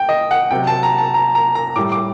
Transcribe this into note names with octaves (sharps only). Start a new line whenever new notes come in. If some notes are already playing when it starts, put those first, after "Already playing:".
Already playing: G5
D#5
F#5
C3 F#3 G5
A5
A#5
A5
A#5
A#5
A#5
A2 G3 D6
D6